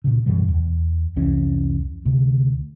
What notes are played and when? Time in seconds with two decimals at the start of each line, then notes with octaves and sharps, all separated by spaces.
0.04 A#2 C#3
0.26 F#2 B2 E3 G3
0.48 E2
1.16 C2 F2 E3 C#4
2.05 D2 C3